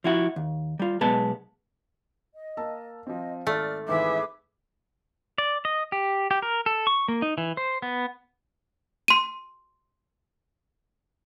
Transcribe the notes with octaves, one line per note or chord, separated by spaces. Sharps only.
F3 E4 F#4
D#2
G3 F4
B1 G#3 B3 A5
D#5
A#3 A5 E6
F3 C4 D#5
G#1 A3 D5 F6
G#1 E3 G#4 B4 E5 D6
D5
D#5
G4
G4
A#4
A4
C#6
A#3
D#4
E3
C5
B3
C6 D#7